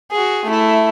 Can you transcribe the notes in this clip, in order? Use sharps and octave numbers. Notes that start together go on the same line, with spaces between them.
F#4 G#4
A3 E4